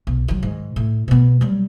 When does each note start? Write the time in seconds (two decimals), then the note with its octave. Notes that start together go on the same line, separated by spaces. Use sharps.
0.07 B1
0.28 D#3 F#3
0.43 G#2 D#3
0.76 A2
1.08 B2 B3
1.41 F#3 G3